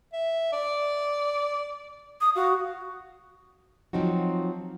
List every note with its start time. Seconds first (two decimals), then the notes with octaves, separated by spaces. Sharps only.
0.13 E5
0.53 D5
2.21 D#6
2.36 F#4 F5
3.93 F3 F#3 C4 D#4 F#4